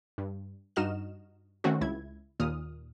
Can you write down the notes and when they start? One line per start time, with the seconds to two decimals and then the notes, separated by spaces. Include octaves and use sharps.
0.18 G2
0.76 G2 D#4 F#4 D#5 F6 E7
1.64 D#3 A3 C4 C#4 F#4
1.81 C#2 E4 G#6
2.40 D#2 A#2 D#6 F6